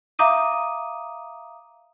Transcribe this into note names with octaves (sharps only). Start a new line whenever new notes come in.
E5 F5 A#5 D6 D#6 D#7